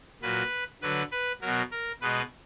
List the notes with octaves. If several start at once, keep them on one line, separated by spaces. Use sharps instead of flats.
A#2 F#3 B4
D3 F#3 B4
B4
B2 F#3 A#4
A#4
B2 G#3 B4